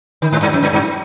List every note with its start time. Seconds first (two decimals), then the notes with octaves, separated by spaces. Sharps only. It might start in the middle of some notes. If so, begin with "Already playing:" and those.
0.22 D#3
0.32 G#2
0.42 G2
0.53 F2
0.63 G2
0.73 G2